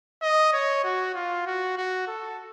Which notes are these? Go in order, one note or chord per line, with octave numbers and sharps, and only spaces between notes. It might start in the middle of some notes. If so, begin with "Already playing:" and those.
D#5
C#5
F#4
F4
F#4
F#4
A4